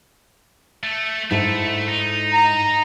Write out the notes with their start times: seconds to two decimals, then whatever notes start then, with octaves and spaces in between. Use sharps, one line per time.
0.83 A3
1.31 G#2 A3 E4 A4
1.88 D#4
2.33 A#5